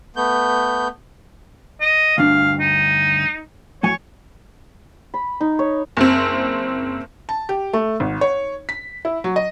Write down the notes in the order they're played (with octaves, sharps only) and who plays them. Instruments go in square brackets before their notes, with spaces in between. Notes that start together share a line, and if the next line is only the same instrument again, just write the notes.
[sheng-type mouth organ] A3 B3 G6
[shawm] D#5
[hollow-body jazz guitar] D2 G2 D4 [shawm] F5
[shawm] D#4
[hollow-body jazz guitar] A2 F#3 G#5 [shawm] C#5
[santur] B5
D#4
C#5
[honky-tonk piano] F#1 C4
[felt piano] A5
G4
A3
G#1
C#5
B6
E4
F#3
D#5